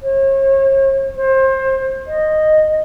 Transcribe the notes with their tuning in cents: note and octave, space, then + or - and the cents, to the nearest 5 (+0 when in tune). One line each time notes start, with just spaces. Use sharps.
C#5 -40
C5 +25
D#5 -10